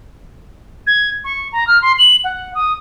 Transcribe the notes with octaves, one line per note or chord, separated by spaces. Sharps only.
G#6
C#6
A#5
F6
C6
F#7
F#5
D#6